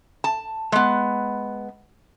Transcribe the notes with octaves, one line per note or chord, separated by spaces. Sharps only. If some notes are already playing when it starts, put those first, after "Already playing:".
A5
G#3 B3